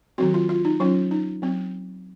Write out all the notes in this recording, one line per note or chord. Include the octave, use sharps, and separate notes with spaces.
D#3 F#3 C4 F#4
F4
F4
D#4
F#3 C#4 F4
D#4
F#3 C4